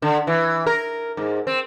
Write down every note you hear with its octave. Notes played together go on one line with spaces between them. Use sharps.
D3
E3
A#4
G#2
C4